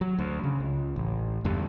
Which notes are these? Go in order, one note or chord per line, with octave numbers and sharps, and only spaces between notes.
F#3
D2
C#3
C#2
A1
E2 G2 D3